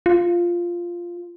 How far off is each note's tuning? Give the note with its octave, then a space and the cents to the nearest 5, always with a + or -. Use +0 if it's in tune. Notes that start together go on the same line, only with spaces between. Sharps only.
F4 -5